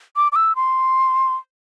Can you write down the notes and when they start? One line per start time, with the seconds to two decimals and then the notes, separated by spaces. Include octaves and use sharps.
0.16 D6
0.32 D6
0.36 E6
0.56 C6